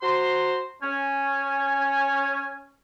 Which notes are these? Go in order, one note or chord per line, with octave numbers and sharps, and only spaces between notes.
F#4 C5 A#5 C6
C#4 G#5